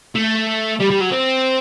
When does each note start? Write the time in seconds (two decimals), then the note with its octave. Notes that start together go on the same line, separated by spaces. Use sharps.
0.15 A3
0.80 G3
0.90 G3
1.01 F#3
1.11 C4